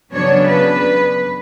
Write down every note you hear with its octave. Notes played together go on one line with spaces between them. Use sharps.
C#3 F#3 B3 D4 C#5
B4